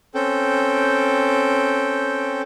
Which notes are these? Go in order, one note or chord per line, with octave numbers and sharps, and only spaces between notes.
C4 C#4 A4 G5